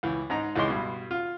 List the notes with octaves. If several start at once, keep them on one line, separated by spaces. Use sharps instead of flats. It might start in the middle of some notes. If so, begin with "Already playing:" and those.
C#2 E3
G#2 D#4 A#5
C#2 E3 G#3 D#5 C6
G2 B2
F4